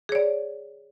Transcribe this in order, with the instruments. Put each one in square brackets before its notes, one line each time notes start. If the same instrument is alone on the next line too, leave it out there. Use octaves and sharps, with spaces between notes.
[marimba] G#4
C#5
D5